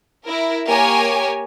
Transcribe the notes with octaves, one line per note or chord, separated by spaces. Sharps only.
E4 A#4
A#3 G4 A#4 C#5 G#5